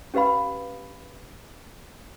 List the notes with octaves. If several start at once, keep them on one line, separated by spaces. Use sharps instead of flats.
C#4 G4 B4 F5 B5